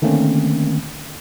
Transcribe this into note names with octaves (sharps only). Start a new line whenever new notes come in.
D3 D#3 A3 A#3 C4 C#4